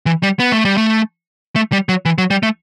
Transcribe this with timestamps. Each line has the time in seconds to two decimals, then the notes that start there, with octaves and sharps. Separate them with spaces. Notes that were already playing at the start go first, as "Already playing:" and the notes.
0.06 E3
0.23 G3
0.40 B3
0.52 A3
0.65 G3
0.77 A3
1.56 A3
1.72 G3
1.89 F#3
2.05 E3
2.18 F#3
2.30 G3
2.43 A3